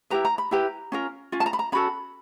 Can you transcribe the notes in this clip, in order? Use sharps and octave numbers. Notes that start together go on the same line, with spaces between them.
E4 G4 B4 A#5
A#5
B5
E4 G4 B4 A#5
C#4 F4 A#4
C#4 F4
A5
A#5
B5
A#5
C#4 F#4 A4 B5